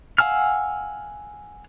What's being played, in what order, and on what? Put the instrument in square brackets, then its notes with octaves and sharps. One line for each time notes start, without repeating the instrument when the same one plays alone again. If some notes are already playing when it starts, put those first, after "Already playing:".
[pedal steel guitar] F5 F#5 G#5 E6 F6